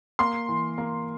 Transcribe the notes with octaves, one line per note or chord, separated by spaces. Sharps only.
A#3 C6
E3
A#3